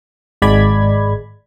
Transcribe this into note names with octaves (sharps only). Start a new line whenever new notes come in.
G#1 G#3 D5 B5 G#6